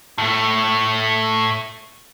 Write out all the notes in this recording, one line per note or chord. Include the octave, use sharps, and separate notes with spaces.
A2 A3